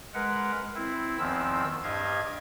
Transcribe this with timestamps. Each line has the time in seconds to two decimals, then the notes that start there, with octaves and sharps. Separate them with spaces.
0.14 G#3 A#4 B4 F#5
0.75 C4 E4
1.18 E2 D#3 F3 C4 E6
1.83 G2 G4 D#5 F5 G#6